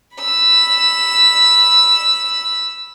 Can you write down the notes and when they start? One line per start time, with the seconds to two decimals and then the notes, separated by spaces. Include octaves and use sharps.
0.17 B5 E6